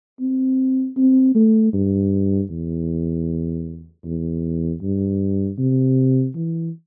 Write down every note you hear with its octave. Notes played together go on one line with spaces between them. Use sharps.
C4
C4
A3
G2
E2
E2
G2
C3
E3